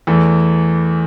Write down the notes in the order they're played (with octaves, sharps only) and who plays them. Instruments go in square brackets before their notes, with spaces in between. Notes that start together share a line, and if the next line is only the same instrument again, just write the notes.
[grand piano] E2 E3 A3